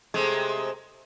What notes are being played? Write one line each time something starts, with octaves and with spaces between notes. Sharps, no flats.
C3 G#3 A3